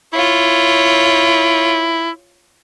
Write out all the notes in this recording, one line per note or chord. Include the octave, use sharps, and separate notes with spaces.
E4 F4 C#5